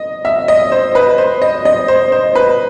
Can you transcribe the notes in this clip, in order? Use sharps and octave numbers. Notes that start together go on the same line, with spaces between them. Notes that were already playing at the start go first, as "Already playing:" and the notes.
Already playing: D#5
E5
D#5
C5
B4
C5
D#5
D#5
C5
C5
B4